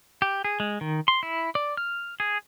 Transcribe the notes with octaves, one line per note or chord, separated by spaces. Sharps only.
G4
G#4
G#3
D#3
C6
E4
D5
F6
G#4